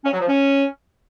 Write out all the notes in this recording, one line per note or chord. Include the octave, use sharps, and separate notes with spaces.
C#4
F#3
F3
C#4